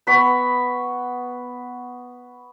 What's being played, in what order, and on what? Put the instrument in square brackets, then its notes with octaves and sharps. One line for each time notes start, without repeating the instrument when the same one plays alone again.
[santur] B3 B5 C#6